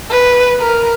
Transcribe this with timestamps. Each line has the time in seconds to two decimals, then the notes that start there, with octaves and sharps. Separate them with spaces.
0.10 B4
0.60 A#4